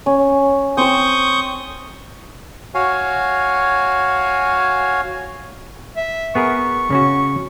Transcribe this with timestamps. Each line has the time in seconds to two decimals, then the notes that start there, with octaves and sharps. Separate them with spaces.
0.06 C#4
0.77 C4 C5 C#6 D#6 G6
2.74 F#4 C#5 F5 G#5
5.96 E5
6.35 B3 G#4 A#4 C#6
6.90 C#3 C#4 F#4